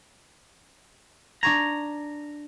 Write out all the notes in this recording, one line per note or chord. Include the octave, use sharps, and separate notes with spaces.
D4 A#5 C#6 G#6